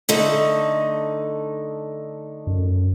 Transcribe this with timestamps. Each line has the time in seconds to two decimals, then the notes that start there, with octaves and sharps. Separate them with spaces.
0.09 D3 A3 D#4
2.47 F#2